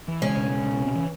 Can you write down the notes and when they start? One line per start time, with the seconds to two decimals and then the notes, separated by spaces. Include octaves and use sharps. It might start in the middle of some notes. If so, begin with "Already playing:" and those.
0.08 E3
0.22 C#3 G#3 C#4
0.37 B2
0.51 G#3
0.67 B2
0.80 C3
0.96 E3